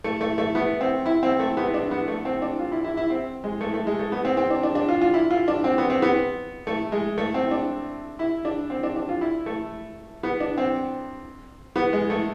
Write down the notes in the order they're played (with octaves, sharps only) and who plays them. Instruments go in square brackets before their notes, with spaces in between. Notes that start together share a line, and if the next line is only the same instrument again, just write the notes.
[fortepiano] A3
A3
A3
B3
C4
E4
C4
A3
B3
D4
B3
A3
C4
D4
F4
E4
E4
E4
C4
G#3
A3
A3
G#3
A3
B3
C4
C4
D4
D4
D4
F4
F4
E4
F4
D4
C4
B3
C4
B3
A3
G#3
A3
C4
D4
E4
D4
C4
D4
D4
F4
E4
A3
B3
D4
C4
B3
G#3
A3